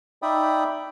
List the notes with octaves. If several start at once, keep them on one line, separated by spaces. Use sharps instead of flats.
D#4 D5 E5 G5 B5 D#6